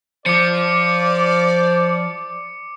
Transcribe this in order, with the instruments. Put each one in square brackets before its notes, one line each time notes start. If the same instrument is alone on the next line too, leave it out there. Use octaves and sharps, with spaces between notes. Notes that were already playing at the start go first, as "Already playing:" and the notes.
[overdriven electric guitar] F3 [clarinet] C5 [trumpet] D5 [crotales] D6 C#7